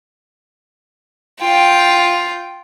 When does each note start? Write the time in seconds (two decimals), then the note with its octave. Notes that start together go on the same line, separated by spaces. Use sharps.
1.41 F4 G5